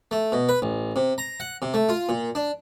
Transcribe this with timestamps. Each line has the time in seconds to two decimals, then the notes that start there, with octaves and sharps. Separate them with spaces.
0.11 A3
0.32 B2
0.49 B4
0.62 A1
0.96 C3
1.18 A#5
1.40 F#5
1.62 C3
1.74 A3
1.89 F4
2.09 A#2
2.35 D4